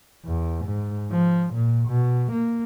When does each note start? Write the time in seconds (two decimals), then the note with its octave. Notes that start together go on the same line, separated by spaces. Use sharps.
0.25 E2
0.65 G#2
1.12 F3
1.54 A#2
1.88 B2
2.32 A#3